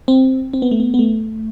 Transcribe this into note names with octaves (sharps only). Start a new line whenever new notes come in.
C4
C4
B3
A3
B3
B3
A3